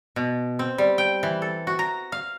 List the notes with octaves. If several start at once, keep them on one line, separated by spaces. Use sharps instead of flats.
B2
C4
G3
G5
E3
A4
F#4
A#5
F5